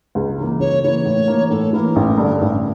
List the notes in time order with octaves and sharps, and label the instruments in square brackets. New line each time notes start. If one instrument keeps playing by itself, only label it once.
[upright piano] C#2
C#3 E3 A#3
[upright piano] C#2 [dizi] C#5
[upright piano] C#3 E3 A#3 [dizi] C#5
[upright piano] A2
E3 A#3
[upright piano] A2 [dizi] A4
[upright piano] E3 A#3 [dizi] A#4
[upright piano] A1
G2 D3
A1